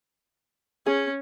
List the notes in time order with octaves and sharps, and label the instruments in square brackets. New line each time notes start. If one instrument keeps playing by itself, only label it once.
[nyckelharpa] C#4 [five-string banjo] G#4